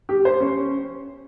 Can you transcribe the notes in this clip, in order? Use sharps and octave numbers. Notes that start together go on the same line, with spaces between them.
G4
C5
C#4